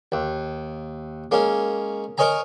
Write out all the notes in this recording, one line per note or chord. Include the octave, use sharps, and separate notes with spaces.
D#2
G#3 A#3 C#4
A#4 C#5 D#5 G#5 A#5